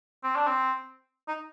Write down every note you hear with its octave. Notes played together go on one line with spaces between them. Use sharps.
C4
D4
C4
D#4